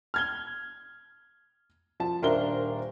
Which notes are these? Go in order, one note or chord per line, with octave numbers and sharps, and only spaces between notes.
F6 G#6 G7
F3 A5
D#1 D4 A#4 C5 E5 G7